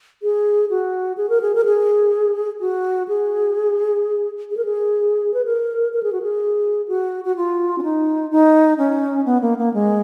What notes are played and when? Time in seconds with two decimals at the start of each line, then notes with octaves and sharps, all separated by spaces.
0.23 G#4
0.70 F#4
1.17 G#4
1.30 A#4
1.41 G#4
1.55 A#4
1.65 G#4
2.60 F#4
3.08 G#4
4.50 G#4
4.57 A#4
4.65 G#4
5.34 B4
5.45 A#4
5.93 A#4
6.03 G#4
6.13 F#4
6.22 G#4
6.88 F#4
7.25 F#4
7.36 F4
7.78 C#4
7.83 D#4
8.31 D#4
8.78 C#4
9.26 B3
9.42 A#3
9.58 A#3
9.74 G#3